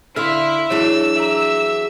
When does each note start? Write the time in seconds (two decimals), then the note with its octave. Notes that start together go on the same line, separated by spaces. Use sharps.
0.16 D3 E4 E5 F5 C6 F6
0.70 E3 F#3 D4 E4 G#4 C#5 E6
1.16 G#4 E5 A#5